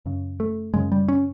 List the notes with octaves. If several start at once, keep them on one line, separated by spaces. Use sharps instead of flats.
F#2 C#3
A3
F#2 C#3 G#3
G3
C#4